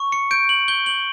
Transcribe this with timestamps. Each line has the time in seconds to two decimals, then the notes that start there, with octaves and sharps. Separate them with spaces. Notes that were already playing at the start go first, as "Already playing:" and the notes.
Already playing: C#6
0.12 C#7
0.31 G6 D7
0.49 F#7
0.68 G6 G7
0.86 F#7